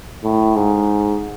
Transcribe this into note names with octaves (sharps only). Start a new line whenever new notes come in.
A2
G#2